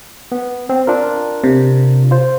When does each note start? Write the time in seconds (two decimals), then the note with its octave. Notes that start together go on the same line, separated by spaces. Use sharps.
0.32 B3
0.69 C4
0.87 D4 F4 A#4
1.44 C3
2.11 F4 C5